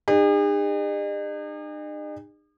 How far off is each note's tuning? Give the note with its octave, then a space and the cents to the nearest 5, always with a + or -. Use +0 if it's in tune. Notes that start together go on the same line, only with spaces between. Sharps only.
D#4 -45 G#4 -45